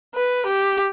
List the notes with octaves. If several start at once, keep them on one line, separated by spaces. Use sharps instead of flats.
B4
G4